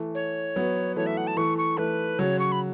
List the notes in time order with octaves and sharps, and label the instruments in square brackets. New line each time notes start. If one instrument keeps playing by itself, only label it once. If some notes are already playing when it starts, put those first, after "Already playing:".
Already playing: [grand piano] E3 A3
[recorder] C#5
[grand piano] F#3 B3
[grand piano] E3 A3 [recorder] C#5
[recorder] E5
F#5
A5
[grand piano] E3 A3 [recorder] C#6
[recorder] C#6
[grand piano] E3 A3 [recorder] B4
[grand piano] C#3 F#3 [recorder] C#5
[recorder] C#6
B5